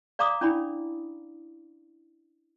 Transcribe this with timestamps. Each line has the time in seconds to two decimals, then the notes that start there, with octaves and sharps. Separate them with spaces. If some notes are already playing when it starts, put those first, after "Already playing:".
0.19 D5 F5 A#5 D6 D#6
0.41 C#4 D4 E4 D5 B5